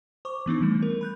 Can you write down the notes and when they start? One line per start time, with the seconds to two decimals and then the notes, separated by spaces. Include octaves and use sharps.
0.25 C5 C#6 D6
0.46 E3 B3 D4 D#4
0.61 E3 G3 A3
0.83 A#4
1.01 B5 F#6 G6